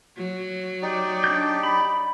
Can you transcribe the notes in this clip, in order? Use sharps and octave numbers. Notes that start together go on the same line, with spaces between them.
F#3
D#4 G4 D5
D4 G6
B5